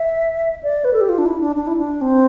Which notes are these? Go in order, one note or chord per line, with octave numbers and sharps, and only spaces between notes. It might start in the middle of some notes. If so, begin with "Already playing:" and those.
Already playing: E5
D5
B4
A4
G4
F4
D4
E4
D4
D4
E4
D4
C4